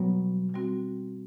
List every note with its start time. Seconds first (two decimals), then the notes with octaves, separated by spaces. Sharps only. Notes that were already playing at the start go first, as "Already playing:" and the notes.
Already playing: B2 F#3 G3 B3
0.54 G3 C4 F#4